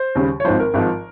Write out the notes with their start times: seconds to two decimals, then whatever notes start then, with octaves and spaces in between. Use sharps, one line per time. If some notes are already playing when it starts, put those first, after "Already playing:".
Already playing: C5
0.15 D#2 C#3 G3
0.40 C#5
0.45 G#1 G#2 F3 C5
0.59 A#4
0.74 G#1 G#2 F3